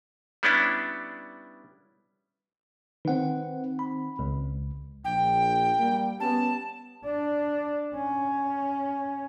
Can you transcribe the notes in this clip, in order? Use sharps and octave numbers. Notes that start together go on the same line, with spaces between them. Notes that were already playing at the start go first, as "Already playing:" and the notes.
G3 B3 C#4 D4 E4
D#3 C4 B4 F#5
B5
C#2
A#1 G5
G3 A#3
B3 C#4 G4 A5
D4
C#4